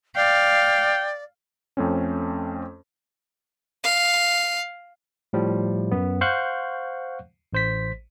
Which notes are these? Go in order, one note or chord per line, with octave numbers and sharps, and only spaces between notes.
D5 F5 G5
F2 A3 C4 C#4
F5
A2 F3 G3
F#2 B3
C5 F5 F#5 C#6 F#6 G6
A1 C5 B6